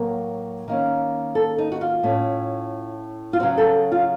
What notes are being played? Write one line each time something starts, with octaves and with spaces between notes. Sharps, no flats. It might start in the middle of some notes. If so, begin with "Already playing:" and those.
Already playing: A2 F#3 A#3 A#4
D#3 A#3 C#4
A4
D#4
F#4
F4
A2 A3 C#4
F4
C#3 F#3 C4 F#4
A4
F4